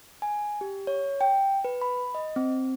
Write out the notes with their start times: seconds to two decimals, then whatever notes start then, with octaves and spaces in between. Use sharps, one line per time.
0.22 G#5
0.61 G4
0.87 C#5
1.21 G5
1.65 B4
1.82 B5
2.15 D#5
2.36 C4